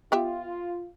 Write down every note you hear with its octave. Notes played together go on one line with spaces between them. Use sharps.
B3 F4 G4 E5